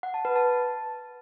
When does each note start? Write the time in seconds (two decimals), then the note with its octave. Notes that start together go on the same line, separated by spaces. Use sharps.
0.03 F#5
0.14 A5
0.25 B4
0.36 A5